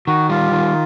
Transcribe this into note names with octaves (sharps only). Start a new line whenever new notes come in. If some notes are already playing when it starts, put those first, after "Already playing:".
D#3 F#4
G3 F4
D#3